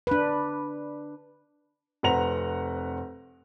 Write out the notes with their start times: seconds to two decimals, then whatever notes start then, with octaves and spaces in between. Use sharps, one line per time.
0.07 D4 B4
2.03 F1 C4 B4 F#5 A#5 F7